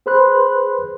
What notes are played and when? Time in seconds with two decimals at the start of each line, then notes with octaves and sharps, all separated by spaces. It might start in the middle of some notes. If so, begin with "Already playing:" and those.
0.06 G#4 B4 C5 B5 C6 F#6